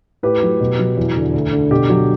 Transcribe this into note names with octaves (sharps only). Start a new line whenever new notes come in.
A2 G4 B4
F#3
B2
F#3
E2
D3
D2
D3
B2 G4
F#3